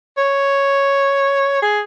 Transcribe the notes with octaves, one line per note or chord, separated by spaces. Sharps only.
C#5
G#4